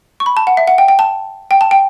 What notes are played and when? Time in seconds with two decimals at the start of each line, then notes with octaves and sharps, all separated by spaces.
0.20 C#6
0.26 B5
0.37 A5
0.47 F#5
0.57 E5
0.67 F#5
0.78 G5
0.88 G5
0.99 A5
1.51 G5
1.61 A5
1.71 G5